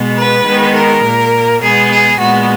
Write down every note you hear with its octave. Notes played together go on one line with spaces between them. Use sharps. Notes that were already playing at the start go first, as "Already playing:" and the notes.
Already playing: B2 G#3 B3
B4
D#3 G#3 B3
A#4
A#2 A#3
B2 G#3 B3 G#4
G#4
A#2 G#3 B3 F#4